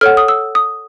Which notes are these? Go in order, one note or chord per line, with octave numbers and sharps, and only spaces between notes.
A4 C#5 F#5 F6
D#6
E6
D#6